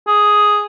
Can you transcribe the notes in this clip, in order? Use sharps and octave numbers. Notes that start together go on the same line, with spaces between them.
G#4